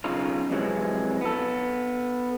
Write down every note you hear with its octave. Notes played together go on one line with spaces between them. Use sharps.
B1 C#3 D#4 F4
F2 C3 E3 F#3 G#3
B3 A4